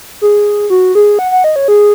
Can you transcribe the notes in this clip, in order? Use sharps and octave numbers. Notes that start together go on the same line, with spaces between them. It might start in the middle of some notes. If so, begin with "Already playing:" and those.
G#4
F#4
G#4
F#5
F#5
D#5
C#5
G#4